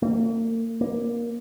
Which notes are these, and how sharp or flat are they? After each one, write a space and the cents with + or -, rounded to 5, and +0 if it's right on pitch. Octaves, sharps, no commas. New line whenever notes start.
A#3 -40
A#3 +15